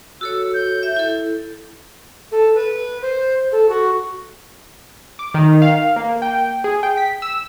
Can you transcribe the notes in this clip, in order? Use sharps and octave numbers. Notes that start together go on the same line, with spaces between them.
F#4 A4 C#5 E6
G6
E5
E4 A4
A4
B4
C5
A4
F#4
D6
D#3
F5
A#3
G5
G#4
G5
B6
E6